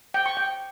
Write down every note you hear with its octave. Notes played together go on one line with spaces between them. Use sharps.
G5
C#6
G5